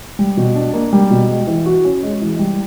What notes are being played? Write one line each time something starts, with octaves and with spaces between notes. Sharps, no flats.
G3
B2
D4
A#3
G3
B2
G#3
E3
F#4
C#4
G#3
E3
G3